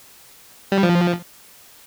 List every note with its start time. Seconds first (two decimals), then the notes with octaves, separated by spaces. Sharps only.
0.72 G3
0.83 F3